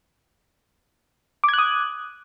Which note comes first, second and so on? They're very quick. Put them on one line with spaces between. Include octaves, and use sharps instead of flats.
D6 G#6 F#6 D#6